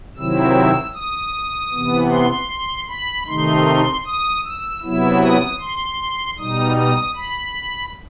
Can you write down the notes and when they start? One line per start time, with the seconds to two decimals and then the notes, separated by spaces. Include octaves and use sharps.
0.17 C3 D#3 F#3 C4 E4 E6
0.95 D#6
1.72 C3 E3 B3
2.10 C6
2.88 B5
3.27 C3 D#3 A3 D#4 C6
4.05 D#6
4.44 E6
4.83 C3 F#3 B3 E4 E6
5.22 D#6
5.60 C6
6.38 B2 G3 D#4 D#6
6.77 D#6
7.16 B5